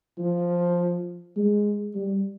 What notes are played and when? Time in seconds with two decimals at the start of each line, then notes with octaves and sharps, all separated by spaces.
0.18 F3
1.36 G#3
1.94 G3